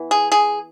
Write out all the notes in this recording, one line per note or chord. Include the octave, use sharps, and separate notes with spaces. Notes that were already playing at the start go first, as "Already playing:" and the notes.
Already playing: E3 B3
G#4
G#4